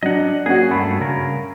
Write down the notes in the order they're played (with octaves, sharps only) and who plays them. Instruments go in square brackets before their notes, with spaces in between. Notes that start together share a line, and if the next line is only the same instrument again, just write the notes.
[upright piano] F#3 D4 [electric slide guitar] D#5 F#5
[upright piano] A#3 C#4 F#4 [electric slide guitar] G#4
[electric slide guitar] G2 A3 [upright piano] B5
[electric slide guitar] C#3 A#4